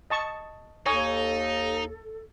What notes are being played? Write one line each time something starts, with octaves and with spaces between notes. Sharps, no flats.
D#5 A5 C#6
D#2 D#4 A4 C#5 G#5 D#6